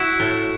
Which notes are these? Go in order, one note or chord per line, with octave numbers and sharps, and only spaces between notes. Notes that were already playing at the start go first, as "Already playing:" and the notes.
Already playing: E4 F#4
A2